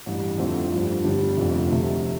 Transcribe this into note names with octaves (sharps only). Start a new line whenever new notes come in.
A1 G2 G3
F2 D3 A3 C4
G2 F3 D4
G1 G2 G3 D4
F1 F2 D3
D2 C3 A3